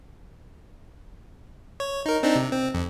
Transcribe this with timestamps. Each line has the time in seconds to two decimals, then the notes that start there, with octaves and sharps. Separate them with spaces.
1.80 C#5
2.06 D#4 A#4
2.23 C4 D4 D#4
2.36 C3
2.52 C4
2.74 F2